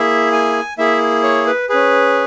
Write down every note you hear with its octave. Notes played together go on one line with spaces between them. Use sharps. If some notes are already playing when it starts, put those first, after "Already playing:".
Already playing: A#3 E4 G#4 E5
G#5
A#3 E4 G#4 E5
C#5
B4
C#4 G#4 B4